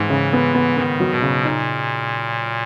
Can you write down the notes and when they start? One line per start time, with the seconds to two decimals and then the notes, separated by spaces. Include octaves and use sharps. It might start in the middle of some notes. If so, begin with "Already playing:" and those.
Already playing: G#2 E3
0.10 C#3
0.33 B3
0.54 B3
0.77 D#3 B3
1.00 F#3
1.11 B2
1.22 C#3
1.44 A#2 D#4